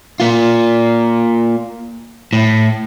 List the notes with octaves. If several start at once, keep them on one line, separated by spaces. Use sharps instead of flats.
A#3 F4
A2